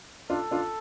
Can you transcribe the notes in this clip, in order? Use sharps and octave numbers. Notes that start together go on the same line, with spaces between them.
D4 F4 A4
D4 F4